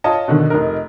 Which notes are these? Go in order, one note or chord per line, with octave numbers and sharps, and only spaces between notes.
F4 C#5 D#5 A5
B2 D3 D#3
F1 D#4 A#4